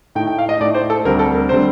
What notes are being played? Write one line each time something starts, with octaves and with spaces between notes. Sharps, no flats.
A2 A3 D#4 G5
G5
F5
D#5
A2 A3 D#4 D5
C5
A4
D2 D3 G3 C4 A#4
A4
A#4
D3 G3 C4 C5